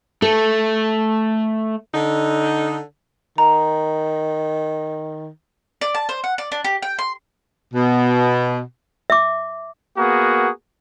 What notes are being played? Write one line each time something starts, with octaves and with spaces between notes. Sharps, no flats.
A3 A4
D3 D#4
D#3 A#5
D5
A5
C5
F#5
D5
D4
G4
G5
C6
B2
E5 D6
A#3 B3 F#4 G#4 A#4